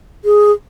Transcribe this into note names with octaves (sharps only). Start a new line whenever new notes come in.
G#4